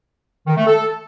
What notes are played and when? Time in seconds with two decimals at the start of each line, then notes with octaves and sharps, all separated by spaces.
0.47 D#3
0.57 A3
0.67 A4